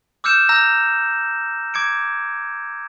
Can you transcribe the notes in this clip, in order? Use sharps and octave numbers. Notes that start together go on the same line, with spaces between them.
D6 E6 F6 G6 C#7 E7
A#5 E6 G6 A#6
D6 G#6 C#7 D7